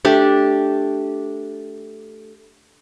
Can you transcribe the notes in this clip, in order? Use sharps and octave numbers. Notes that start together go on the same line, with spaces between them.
A3 D4 G4